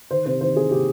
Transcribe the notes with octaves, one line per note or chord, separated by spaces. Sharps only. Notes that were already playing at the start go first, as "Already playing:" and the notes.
D#3 C5
C3 C5
D#3 C5
C3 G#4
C3 G4